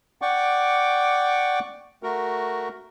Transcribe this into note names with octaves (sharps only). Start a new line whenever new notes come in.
D5 F#5 G5 C#6 D6
A3 F#4 A#4